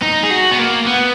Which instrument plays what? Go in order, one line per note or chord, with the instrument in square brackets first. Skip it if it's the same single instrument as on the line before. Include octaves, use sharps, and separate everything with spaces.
[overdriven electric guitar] D#4
G#4
F#4
B3
A#3
B3